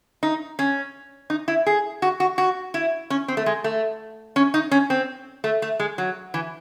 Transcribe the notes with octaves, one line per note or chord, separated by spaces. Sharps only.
D#4
C#4
D#4
E4
G#4
F#4
F#4
F#4
E4
C#4
C4
A3
G#3
A3
C#4
D#4
C#4
C4
A3
A3
G#3
F#3
E3